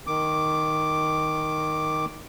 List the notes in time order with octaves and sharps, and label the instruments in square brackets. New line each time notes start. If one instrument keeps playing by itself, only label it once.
[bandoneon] D#3 D6